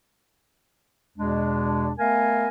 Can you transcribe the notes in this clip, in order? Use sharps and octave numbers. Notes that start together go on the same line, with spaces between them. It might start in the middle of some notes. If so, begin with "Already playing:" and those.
E2 B2 G#3 D4
A3 B3 A#4 F5 G#5